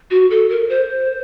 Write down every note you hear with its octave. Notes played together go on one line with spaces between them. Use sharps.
F#4
A4
A#4
C5